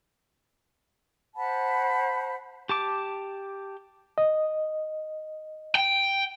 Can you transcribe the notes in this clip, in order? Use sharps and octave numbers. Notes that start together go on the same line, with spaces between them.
C5 F#5 A5 B5
G4 A5 D6
D#5
G5